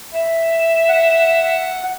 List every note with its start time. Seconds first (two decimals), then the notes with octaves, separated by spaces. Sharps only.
0.14 E5
0.89 F#5